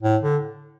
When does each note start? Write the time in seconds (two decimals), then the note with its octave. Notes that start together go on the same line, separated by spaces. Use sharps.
0.03 A2
0.23 D3